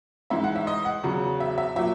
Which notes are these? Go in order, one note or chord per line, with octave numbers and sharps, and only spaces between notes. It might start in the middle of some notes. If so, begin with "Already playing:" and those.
G#2 E3 E5
F#5
E5
D#5
F#5
E2 C#3 F#3
E5
E5
A#2 F#3 E5